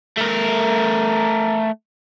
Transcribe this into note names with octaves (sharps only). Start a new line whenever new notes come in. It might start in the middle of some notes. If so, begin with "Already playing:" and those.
A3 A#4